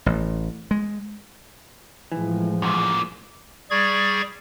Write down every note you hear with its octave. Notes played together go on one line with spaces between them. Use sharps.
A1
G#3
A2 E3 F3 G#3
F#2 A#2
G3 G#4 D5 C#6 G#6